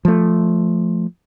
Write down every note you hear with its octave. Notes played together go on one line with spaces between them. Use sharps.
F3 A3